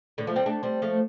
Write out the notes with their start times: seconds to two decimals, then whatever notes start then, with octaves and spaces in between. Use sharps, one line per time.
0.18 A2 D3
0.27 F3 A3
0.36 G3 C4
0.46 A3 D4
0.63 G3 C4
0.82 F3 A3